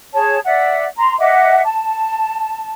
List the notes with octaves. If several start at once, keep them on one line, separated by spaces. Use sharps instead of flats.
G#4 C#5 A5
D5 E5 F#5
A#5 C6
D#5 E5 F#5 D6
A5